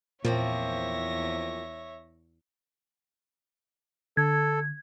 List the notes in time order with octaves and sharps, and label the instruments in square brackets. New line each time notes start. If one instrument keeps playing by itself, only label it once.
[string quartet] E2 A#6 [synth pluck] A#2 [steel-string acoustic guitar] F3 A#3 C4 [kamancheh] C#5 E5
[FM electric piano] D3 [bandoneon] A4 [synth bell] G#6